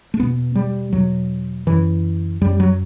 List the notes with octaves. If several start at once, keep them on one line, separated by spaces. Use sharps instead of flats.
A3
E2 B2 B3
G3
E2 B2 F#3
F#2 E3
F#2 G3
F#3